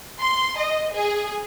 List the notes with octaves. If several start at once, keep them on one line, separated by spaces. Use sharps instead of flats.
C6
D#5
G#4